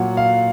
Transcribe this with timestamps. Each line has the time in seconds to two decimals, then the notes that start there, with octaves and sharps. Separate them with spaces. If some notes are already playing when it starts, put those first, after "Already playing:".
Already playing: A#2 F#3 F#5
0.17 F5